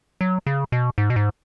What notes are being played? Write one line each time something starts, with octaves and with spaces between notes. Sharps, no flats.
F#3
C#3
B2
G#2
B2
G#2